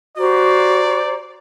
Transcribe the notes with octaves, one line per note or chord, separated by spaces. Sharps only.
F#4 G4 C5 D5 A#5